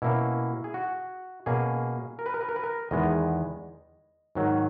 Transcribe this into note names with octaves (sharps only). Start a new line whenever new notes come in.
B2 A#3 C#4 E4
G#4
F#4
B2 A#3 C#4 G#4
A#4
B4
A#4
B4
A#4
B4
A#4
E2 D#3 G#3 B3 D#5
G#2 D#3 F#3